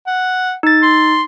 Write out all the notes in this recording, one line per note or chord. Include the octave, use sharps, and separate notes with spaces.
F#5
D#4 A6
C6